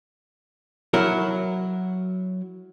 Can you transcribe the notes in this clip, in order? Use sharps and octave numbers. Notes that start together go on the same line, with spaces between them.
F#3 E4 A#4